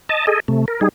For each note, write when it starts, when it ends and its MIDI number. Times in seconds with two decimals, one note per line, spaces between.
0.09 0.26 75
0.09 0.26 81
0.27 0.40 68
0.27 0.40 69
0.27 0.40 75
0.48 0.65 48
0.48 0.65 57
0.68 0.80 70
0.81 0.89 55
0.81 0.89 63
0.81 0.89 68